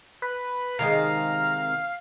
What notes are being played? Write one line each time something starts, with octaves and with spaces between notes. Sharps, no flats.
B4
C3 D#3 G#3 F5 A#5